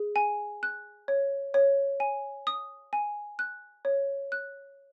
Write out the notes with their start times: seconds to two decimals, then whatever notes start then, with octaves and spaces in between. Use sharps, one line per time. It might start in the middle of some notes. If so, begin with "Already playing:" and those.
Already playing: G#4
0.16 G#5
0.63 F#6
1.08 C#5
1.54 C#5
2.00 G#5
2.47 D#6
2.93 G#5
3.39 F#6
3.85 C#5
4.32 F#6